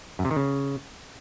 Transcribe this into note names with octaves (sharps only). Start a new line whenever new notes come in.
F#2
C3
D#3
C#3